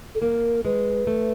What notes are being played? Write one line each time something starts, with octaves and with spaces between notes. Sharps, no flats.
A4
A#3 A#4
G#3 B4
A3